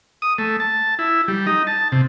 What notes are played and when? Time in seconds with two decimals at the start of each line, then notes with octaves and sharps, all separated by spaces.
0.22 D#6
0.38 A3
0.60 A5
0.99 E4
1.28 G3
1.47 D#4
1.67 A5
1.92 C3